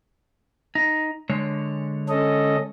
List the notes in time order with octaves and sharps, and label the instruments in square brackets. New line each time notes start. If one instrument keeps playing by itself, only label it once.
[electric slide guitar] D#4
D3 G#3 C#5
[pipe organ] C#4 A4 D#5